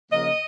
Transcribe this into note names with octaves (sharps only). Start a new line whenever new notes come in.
C#3 F3 A#3 D#5